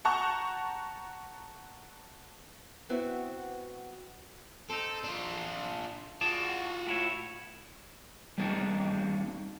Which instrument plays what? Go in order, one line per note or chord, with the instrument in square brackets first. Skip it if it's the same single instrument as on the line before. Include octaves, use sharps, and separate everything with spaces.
[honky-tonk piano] F#5 A5 A#5 C#6 G6
[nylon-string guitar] B3 C4 E4 F#4 B4 C5
[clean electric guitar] C4 D#4 [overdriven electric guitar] A4
[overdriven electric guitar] D4 F4
[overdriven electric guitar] F4 F#4 [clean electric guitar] G#4 D5 A5
[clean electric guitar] A2 E4 C#5
[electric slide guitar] G3 A#3 C4 D4 D#4 F#4